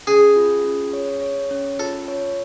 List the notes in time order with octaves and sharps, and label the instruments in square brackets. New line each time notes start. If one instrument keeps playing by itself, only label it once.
[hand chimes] C#4 [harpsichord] G#4
[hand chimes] F4
C#4
C#5
C#5
C#4
[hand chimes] F4 [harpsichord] A4
[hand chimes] C#5